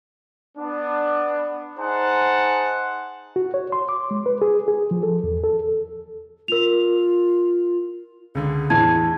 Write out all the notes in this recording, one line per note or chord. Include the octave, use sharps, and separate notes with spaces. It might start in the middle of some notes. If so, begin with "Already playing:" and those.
B3 D4
D#4 G#4 C5 F#5 A5
F#4
C#5
C6
D6
G#3
B4
G#4
G#4
F3
A4
E2
A4
F4 A#4 F7
C#2 D3 G#4
E2 A2 E3 A5 G#6